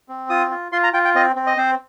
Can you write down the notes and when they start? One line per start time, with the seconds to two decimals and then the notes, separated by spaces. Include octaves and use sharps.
0.09 C4
0.30 F4 D#6
0.51 F4
0.72 F4 C6
0.83 A#5
0.94 F4 G5
1.05 G5
1.15 C4 D#5
1.36 C4
1.47 D#5
1.57 C4 C5